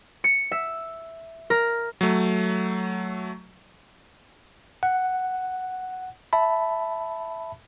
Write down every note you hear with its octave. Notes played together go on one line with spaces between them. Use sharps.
C#7
E5
A#4
F#3 A3
F#5
E5 A5 B5